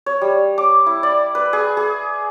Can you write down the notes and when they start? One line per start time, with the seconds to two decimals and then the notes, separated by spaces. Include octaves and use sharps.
0.06 C#5
0.22 G3
0.58 D6
0.86 E4
1.03 D5
1.35 B4
1.53 G#4
1.77 G#4